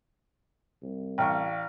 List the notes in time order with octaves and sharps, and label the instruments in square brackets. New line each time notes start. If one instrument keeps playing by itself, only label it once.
[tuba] C2
[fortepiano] A1 C#6 [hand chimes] D5 F5 [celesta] G5 F6